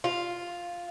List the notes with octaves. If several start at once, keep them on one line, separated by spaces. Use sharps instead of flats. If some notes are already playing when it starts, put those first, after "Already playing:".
F4